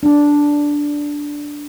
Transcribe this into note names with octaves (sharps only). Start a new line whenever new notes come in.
D4